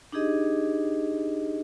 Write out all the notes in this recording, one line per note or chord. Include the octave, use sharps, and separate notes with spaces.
D4 D#4 G4 G#4 D#5